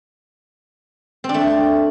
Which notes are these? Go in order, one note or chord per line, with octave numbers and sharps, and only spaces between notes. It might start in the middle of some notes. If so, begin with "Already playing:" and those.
C4
D4
A3